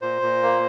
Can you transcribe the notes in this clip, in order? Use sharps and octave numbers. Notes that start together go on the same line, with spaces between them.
A#2 C5
A#2
A#3